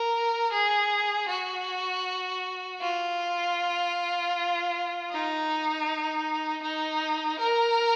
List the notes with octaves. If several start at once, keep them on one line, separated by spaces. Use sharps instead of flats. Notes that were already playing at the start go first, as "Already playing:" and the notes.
Already playing: A#4
G#4
F#4
F4
D#4
D#4
A#4